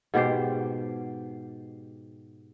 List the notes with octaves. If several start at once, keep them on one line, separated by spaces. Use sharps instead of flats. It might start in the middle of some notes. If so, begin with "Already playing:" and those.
G#2 B2 G4 C5